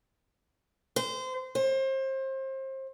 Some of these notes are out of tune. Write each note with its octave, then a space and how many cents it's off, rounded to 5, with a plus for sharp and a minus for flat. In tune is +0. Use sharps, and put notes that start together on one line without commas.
C5 -25
C5 +30